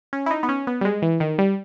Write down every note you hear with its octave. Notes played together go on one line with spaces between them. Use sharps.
C#4
E4
D#4
B3
C#4
B3
G3
G#3
E3
D#3
G3